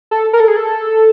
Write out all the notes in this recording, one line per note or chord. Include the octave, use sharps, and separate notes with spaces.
A4
A#4
A4
G#4
A4